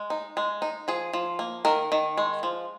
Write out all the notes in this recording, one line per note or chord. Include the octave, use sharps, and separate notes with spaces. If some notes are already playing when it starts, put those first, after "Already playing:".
Already playing: G#3
D#4
G#3
D#4
F3 G#4
F3
A#3
D#3 A#4
D#3
G#3
F3